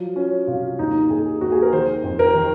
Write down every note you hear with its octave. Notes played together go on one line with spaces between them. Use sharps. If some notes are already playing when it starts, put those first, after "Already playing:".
Already playing: F3 F#3
F#3 C#4
C2 F4
D#2 D#4
D#2 G#4
D#2 F#4
G#4
A#4
D#3 C5
F2
A#4
D#3